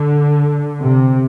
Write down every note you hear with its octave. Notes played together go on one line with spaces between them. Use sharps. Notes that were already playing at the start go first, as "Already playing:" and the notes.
Already playing: D3
C3